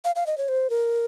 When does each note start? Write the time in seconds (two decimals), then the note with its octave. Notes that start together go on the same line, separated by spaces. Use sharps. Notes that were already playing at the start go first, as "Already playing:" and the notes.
0.05 F5
0.16 F5
0.27 D#5
0.38 C#5
0.48 C5
0.70 A#4